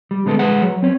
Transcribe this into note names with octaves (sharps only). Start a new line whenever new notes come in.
G3
D3 G#3 B3 A4
G#3 G#4 B4 F#5
F#3
C4 C#5